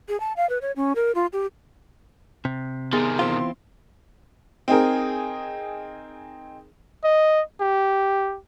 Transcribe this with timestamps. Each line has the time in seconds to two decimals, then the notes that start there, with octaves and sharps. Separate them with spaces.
0.09 G#4
0.20 A5
0.37 F5
0.50 B4
0.62 C#5
0.76 C#4
0.96 A#4
1.15 F4
1.33 G4
2.45 C3
2.93 C3 D#3 B3 G#4
3.19 E3 C4 F4 C6
4.68 C4 D#4 G#4 A#4
7.04 D#5
7.61 G4